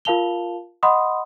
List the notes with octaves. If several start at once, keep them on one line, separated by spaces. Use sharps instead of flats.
F4 A#4 F5 A5 F7 G7
D#5 F#5 B5 C6 D#6